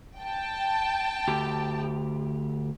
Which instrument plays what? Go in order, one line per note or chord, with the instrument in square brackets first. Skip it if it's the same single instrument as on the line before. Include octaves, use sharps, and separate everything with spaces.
[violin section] G5 A5
[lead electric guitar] D2 G4